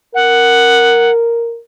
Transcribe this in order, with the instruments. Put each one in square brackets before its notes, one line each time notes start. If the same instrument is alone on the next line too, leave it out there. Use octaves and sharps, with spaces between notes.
[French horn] A#4 [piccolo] F#5